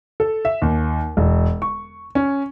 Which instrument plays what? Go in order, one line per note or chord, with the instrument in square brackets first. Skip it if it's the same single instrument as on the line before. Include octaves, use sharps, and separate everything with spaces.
[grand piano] A4
E5
D#2
E1
C#6
C#4